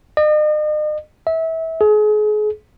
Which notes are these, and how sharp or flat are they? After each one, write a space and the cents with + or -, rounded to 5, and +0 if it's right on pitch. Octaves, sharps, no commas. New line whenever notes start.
D#5 -40
E5 -25
G#4 +35